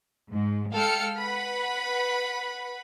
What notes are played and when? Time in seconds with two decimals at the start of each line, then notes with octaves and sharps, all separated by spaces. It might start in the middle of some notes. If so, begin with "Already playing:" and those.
0.31 G#2
0.73 G#3 A4 F5 G5 F6 C#7
1.17 B4 F#5 B5